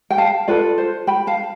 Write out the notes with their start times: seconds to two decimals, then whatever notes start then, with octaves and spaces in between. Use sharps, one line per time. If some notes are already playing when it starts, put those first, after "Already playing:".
0.10 G5
0.18 F5 A5
0.48 F4 A4 B4 D5
0.78 C5
1.07 G5 B5
1.27 F5 A5